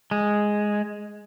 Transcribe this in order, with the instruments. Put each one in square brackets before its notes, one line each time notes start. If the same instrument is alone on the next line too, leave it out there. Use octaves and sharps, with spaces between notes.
[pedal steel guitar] G#3